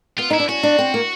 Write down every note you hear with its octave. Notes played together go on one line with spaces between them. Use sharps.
B3 F4
D#4 E4
D4
C#4 F#4
D4
C4
A#3